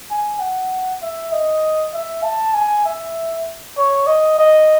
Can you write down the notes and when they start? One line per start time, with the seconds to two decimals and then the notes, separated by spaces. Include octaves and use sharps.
0.10 G#5
0.40 F#5
1.02 E5
1.32 D#5
1.94 E5
2.23 A5
2.54 G#5
2.85 E5
3.77 C#5
4.07 D#5
4.38 D#5